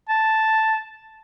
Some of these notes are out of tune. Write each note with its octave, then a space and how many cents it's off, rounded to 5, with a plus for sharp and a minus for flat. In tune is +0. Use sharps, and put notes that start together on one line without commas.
A5 +0